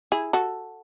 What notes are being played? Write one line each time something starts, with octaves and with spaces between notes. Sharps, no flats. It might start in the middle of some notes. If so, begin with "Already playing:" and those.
E4 G#4
F#4 A4